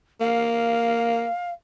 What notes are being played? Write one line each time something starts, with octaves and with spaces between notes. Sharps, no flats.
A#3 F5